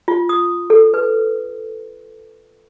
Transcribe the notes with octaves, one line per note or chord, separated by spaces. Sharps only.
F4
D#6
A4
B4